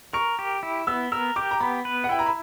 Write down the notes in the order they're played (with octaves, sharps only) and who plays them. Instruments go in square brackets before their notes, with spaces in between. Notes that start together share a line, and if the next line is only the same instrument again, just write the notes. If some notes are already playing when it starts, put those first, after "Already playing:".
[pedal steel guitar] A#4 [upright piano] C#6
[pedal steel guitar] G4
E4
[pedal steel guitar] B3 [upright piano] E6
[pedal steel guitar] A#4 [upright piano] E6
[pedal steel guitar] G4 [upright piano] D6
[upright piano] A#5
[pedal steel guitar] B3 [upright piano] B5
[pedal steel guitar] B4
[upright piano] F#5
[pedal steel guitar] E4 [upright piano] G5
[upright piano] A#5
B5